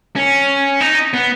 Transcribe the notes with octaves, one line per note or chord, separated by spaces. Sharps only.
C#4
D#4
B3